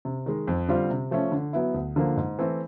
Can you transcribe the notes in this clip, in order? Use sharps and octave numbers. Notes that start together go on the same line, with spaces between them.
C3
D#3 G#3
F2
D3 G3 C4 F4
C3
F3 A3 C#4
D3
F#3 B3 E4
D2
D3 F3 A#3
G#2
E3 A3 C4